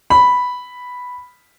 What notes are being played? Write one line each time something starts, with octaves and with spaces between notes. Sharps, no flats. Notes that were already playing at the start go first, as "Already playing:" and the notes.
B5